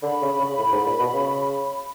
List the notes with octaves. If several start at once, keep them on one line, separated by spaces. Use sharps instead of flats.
D3 B5
C#3
C#3
A2
G#2
A#2
B2
C#3